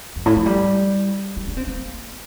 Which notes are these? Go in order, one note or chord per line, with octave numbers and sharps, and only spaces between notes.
F2
A2
F3
G3
G3
D4
C4
A#3